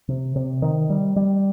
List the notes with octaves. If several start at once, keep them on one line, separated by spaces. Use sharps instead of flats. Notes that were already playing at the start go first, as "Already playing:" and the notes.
C3
C3
D#3
G3
G3